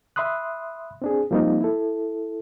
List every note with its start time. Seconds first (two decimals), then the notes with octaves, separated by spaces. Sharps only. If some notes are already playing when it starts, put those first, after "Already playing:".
0.16 E5 B5 C6 D#6 F#6
1.02 C4 D4 G#4
1.31 F3 G3 A#3 C4 D#4 F4
1.61 E4 A4